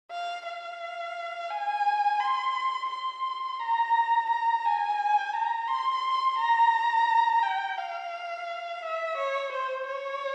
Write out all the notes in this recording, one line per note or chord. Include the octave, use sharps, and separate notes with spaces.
F5
F5
G#5
C6
C6
A#5
A#5
G#5
A#5
C6
A#5
G5
F5
E5
C#5
C5
C#5